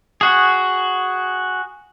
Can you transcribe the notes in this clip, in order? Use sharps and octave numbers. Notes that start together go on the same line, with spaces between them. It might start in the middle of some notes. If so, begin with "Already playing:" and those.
F#4 G#4